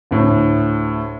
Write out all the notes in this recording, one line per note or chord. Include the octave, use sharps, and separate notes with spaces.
D2 A2